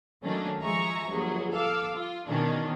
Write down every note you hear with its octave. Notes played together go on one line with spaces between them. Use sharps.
D#3 F#3 A3 A#3 C#4 D4
F3 G#3 E5 G#5 A#5 C#6
G1 F3 F#3 A#3 G#4
A4 F5 D6 E6
F4
B2 D#3 E3 C#4 D4